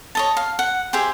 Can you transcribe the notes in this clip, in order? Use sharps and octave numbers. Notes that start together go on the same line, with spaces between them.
C#5 D#5 A5
F5
F#5
G4 G#4 C5 E5